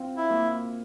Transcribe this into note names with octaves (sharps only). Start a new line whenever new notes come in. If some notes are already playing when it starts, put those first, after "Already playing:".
Already playing: C4 F4
E4
A#3